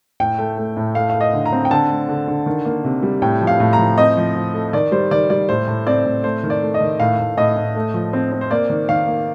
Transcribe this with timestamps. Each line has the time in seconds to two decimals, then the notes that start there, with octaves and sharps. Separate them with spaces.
0.20 A2 G5
0.39 A3
0.58 A3
0.77 A2
0.95 A3 F5
1.10 A3 F5
1.21 D#5
1.33 D3
1.46 A#5
1.52 C4
1.65 G5
1.71 D3 A5
1.90 A3
2.09 D3
2.28 D3
2.46 D#3
2.65 A#3
2.84 C3
3.03 G3
3.22 A2 G5
3.41 F3
3.47 F5
3.60 A2
3.73 A#5
3.79 F3
3.98 C4 D#5
4.17 F3
4.35 F3
4.54 A3
4.73 D#3 D5
4.92 G3 C5
5.11 D#3 D5
5.30 G3 D5
5.49 A2 C5
5.68 A2
5.86 C4 D5
6.05 A2
6.24 A3 C5
6.43 D#3
6.50 D5
6.62 A3
6.74 D#5
6.80 D#3
7.00 A2 F5
7.19 A2
7.37 A2 D#5
7.56 A2
7.76 A3
7.94 F3
8.13 C4
8.32 C4
8.41 C5
8.51 A#3 D5
8.70 D#3
8.89 D#3 F5
9.08 A#3